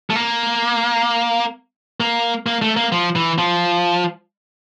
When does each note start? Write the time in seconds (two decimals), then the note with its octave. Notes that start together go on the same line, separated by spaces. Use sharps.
0.10 A3
0.16 A#3
2.00 A#3
2.46 A#3
2.62 A3
2.76 A#3
2.92 F3
3.16 E3
3.38 F3